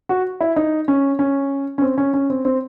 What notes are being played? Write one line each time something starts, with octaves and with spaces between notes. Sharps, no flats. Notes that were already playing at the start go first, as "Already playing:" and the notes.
F#4
E4
D#4
C#4
C#4
C#4
C4
C#4
C#4
C4
C4